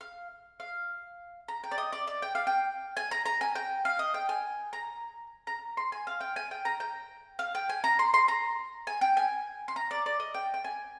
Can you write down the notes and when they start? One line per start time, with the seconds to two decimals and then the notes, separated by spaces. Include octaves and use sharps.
0.01 F5
0.60 F5
1.48 A#5
1.64 G5
1.71 D5
1.78 D#5
1.93 D5
2.07 D5
2.22 G5
2.35 F5
2.47 G5
2.97 G#5
3.11 A#5
3.26 A#5
3.41 G#5
3.55 G5
3.85 F5
3.99 D#5
4.14 G5
4.29 G#5
4.73 A#5
5.47 A#5
5.77 C6
5.92 G#5
6.07 F5
6.21 G5
6.36 G#5
6.51 G5
6.65 A#5
6.80 G5
7.39 F5
7.55 G5
7.69 G#5
7.84 A#5
7.99 C6
8.14 C6
8.28 A#5
8.87 G#5
9.01 G5
9.17 G#5
9.68 C6
9.76 A#5
9.91 D5
10.06 D5
10.20 D#5
10.34 G5
10.54 G5
10.64 G#5